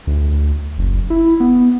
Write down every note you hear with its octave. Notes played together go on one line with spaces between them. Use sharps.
D2
F#1
E4
B3